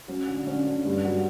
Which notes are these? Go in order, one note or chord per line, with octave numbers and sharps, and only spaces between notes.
F#3 C#4
D3
D3 C#4
D3
G2
F#3